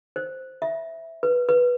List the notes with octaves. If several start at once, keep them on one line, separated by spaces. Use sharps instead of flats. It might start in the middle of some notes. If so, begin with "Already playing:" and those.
C5
E5
B4
B4